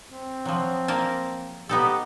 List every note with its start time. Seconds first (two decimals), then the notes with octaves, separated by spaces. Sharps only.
0.12 C4
0.45 F3 F#3
0.88 A#3 A#4 A5
1.69 B3 D#4 G4 A4